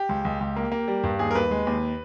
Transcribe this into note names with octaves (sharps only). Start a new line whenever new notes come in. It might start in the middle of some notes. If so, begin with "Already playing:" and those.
Already playing: G4
C#2
C#2
C#2
A#3
A#3
G3
G2
D#2 G#4
A#4
D#2 B4
G#3
D#2